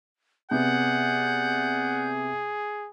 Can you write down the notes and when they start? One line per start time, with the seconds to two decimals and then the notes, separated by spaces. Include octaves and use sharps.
0.51 C3 B3 G#4 D5 F#5 G6